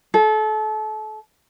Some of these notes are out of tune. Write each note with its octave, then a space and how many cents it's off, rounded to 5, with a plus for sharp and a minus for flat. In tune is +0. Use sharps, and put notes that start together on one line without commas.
A4 -30